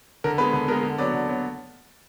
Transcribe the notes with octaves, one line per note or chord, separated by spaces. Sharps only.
D3 A#4
G#3 B3 B4
D3 B4
G#3 B3 A#4
D3
F#3 B3 D5
D3
F#3 B3